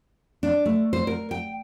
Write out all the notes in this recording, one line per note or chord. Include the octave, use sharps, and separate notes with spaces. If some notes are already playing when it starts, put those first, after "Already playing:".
D4
A3
C5
A#4
G5